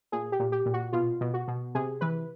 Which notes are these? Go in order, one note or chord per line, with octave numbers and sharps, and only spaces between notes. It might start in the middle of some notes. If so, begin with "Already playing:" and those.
A#2 G#4
G4
A#2
G4
A#2
F#4
B2 F4
B2
F#4
B2
C3 G#4
E3 B4